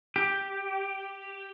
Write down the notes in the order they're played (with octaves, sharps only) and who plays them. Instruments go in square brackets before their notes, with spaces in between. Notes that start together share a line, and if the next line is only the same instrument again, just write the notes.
[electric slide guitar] G4